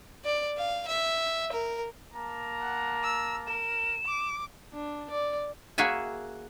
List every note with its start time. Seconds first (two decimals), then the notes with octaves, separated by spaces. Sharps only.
0.25 D5
0.57 F5
0.88 E5
1.52 A#4
2.13 A#3 A5 A#5
2.62 F#5
3.03 E6
3.47 A#4 E7
4.05 D6
4.73 D4
5.10 D5
5.78 A#3 F#4 G#4 E5 G#5